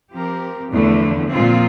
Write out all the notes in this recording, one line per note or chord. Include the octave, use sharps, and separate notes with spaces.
F3 C4 G4 A#4
E2 D3 F3 A3
A#2 F3 C4 F4